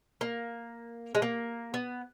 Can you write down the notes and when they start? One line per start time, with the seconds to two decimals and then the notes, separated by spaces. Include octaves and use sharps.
0.21 A#3
1.15 G#3
1.22 A#3
1.74 B3